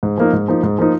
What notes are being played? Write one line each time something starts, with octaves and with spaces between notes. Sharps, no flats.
G#2
F3 A#3 D#4
G#2
F3 A#3 D#4
G#2
F3 A#3 D#4